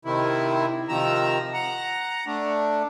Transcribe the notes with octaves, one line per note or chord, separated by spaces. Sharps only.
C3 D#3 E4
C3 D#3 F3 A#5 E6
F#5 A#5
A3 D4